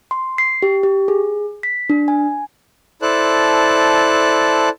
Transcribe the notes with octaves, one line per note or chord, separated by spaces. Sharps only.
C6
C7
G4
G4
G#4
B6
D4
G#5
E4 A4 C5 D5 A5 F#6